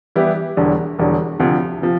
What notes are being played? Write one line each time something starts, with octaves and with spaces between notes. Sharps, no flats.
E3 G3 B3 E4 G4
E1 E2 D3 G3
E1 E2 D3 G3
D2 C3 F3
C3 F3